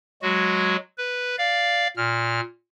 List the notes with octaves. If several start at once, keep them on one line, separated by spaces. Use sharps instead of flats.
F#3 G#3 F#4
B4
D5 F5
A#2 F6